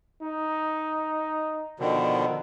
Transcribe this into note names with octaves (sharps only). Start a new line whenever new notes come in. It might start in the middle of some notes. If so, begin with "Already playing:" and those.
D#4
B2 D3 D#3 F3